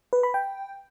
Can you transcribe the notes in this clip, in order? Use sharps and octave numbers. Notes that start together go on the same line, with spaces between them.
B4
B5
G5